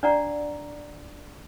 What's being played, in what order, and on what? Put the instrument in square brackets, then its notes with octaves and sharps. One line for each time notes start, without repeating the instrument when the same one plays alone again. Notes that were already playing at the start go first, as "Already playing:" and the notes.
[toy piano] D4 D5 F#5 A#5